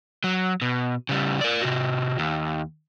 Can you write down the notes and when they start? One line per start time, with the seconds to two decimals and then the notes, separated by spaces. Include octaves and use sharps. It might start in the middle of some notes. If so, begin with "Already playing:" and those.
0.24 F#3
0.62 B2
1.09 C#3 G3
1.41 A#4 D5
1.61 C3 F#4
2.19 D#2